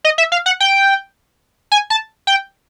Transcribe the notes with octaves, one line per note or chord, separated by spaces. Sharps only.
D#5
E5
F5
F#5
G5
G#5
A5
G5